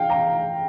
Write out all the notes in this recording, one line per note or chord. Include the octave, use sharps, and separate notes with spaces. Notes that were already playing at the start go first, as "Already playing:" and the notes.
Already playing: F5 G5
A#5